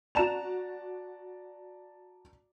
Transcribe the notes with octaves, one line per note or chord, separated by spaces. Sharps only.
F#4 D5 A5 A#5 E7 F7